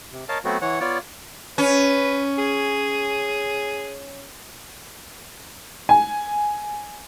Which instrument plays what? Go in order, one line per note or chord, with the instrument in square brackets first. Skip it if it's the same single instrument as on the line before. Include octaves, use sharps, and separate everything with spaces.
[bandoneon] C3
A#4 C#5 D#5 F5 A5
F#3 A3 B3 C4 F#4
E3 C#5 F#5
B3 F4 C#5 D5
[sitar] C#4 [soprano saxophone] B4
[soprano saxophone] G#4
[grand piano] G#5